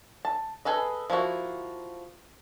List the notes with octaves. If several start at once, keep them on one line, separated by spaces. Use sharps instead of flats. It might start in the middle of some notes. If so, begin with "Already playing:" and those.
A5
G#4 A4 B4 D#5
F3 A#3 E4 F#4